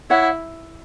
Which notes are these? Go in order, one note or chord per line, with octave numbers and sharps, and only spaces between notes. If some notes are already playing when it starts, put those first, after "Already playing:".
E4 C#5 F#5